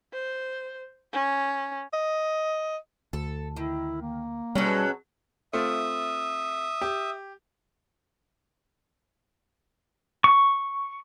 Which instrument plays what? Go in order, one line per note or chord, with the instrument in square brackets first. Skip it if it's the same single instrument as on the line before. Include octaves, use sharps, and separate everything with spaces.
[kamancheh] C5
C#4
[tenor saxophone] D#5
[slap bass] D2 [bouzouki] A4
[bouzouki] D#3 [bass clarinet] E4
[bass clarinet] A#3
[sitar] B2 F#3 [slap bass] G3 [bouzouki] C#4 G#4 A4
[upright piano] A3 C4 F4 [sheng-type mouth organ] E5 D#6
[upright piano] G4
[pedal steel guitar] C#6